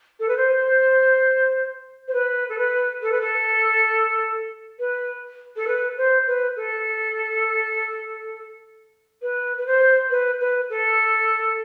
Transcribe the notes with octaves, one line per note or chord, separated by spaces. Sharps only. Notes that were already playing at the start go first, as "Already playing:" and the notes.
A4
B4
C5
C5
B4
A4
B4
A4
B4
A4
B4
A4
B4
C5
B4
A4
B4
B4
C5
B4
B4
A4